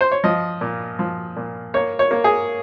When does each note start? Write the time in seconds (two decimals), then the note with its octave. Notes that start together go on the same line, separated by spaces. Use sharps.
0.01 C5
0.12 C#5
0.24 F3 D#5
0.61 A#2
0.99 F3
1.36 A#2
1.74 A#3 C#5
1.99 C#5
2.11 A#3
2.24 G#4